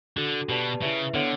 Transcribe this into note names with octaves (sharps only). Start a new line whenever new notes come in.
D3 D4 F#4 A4
B2 G4 B4 D5 A5
C#3 E4 B4 E5
D3 B3 D4 A4 C#5 F#5